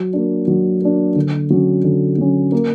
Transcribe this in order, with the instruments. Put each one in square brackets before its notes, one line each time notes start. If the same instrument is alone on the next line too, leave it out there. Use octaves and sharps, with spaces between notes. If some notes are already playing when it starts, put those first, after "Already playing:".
Already playing: [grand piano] F#3
A#3 D4
F#3
A#3 D4
D3
F#3 C#4
D3
F#3 C#4
A#3